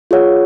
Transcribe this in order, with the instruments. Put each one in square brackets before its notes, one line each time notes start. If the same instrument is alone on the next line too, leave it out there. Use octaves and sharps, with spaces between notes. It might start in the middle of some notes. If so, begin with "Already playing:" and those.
[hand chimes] F4 G#4 C#5 F#5